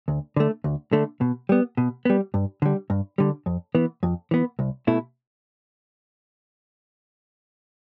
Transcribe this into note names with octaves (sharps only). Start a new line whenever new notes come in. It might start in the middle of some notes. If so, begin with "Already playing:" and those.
D2
D3 A3
D2
D3 A3
B2
G3 B3
B2
G3 B3
G2
D3 G3
G2
D3 G3
F2
E3 B3
F2
E3 B3
C2
B2 A3 E4